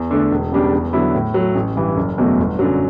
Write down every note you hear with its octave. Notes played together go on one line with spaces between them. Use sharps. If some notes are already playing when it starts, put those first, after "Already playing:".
Already playing: E2
D3 A3 D4
E1
E2 C#3 G3 D4
E2
D3 F#3 B3 E4
A2
F#3 A3
A1
G2 E3 G3
F#1
E2 B2 F#3 A3
G1
F#2 D3 F#3